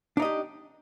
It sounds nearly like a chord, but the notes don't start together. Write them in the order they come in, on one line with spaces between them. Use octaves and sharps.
D4 D#4 D#5 G4